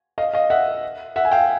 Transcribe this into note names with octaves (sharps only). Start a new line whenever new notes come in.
D#5 F5
D#5 F5
E5 F#5
E5 F#5
G#5
F5 G5